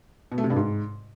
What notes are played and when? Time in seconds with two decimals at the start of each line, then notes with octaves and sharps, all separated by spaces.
0.32 B2
0.38 A3
0.44 C3
0.50 G2
0.56 G#2